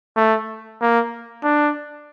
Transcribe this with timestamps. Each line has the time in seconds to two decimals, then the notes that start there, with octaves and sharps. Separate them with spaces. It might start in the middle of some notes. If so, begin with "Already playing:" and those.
0.16 A3
0.81 A#3
1.44 D4